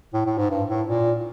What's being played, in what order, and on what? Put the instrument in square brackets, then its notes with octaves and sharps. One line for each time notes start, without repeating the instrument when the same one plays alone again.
[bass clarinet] A2
A2
G#2
G2
A2
A#2